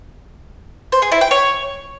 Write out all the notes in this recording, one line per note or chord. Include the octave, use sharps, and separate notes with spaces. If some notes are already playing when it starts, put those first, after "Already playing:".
C5
G#4
E4
G5
C#5